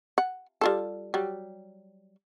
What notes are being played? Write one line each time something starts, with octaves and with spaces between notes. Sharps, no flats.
F#5
G3 F4 A4
F#3 G3